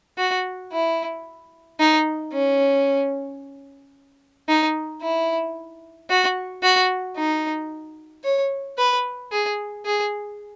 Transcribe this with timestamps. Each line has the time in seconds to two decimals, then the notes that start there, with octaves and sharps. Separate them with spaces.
0.18 F#4
0.72 E4
1.79 D#4
2.33 C#4
4.48 D#4
5.02 E4
6.09 F#4
6.63 F#4
7.17 D#4
8.24 C#5
8.78 B4
9.32 G#4
9.86 G#4